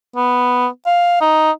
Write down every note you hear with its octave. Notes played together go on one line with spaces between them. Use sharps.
B3
F5
D#4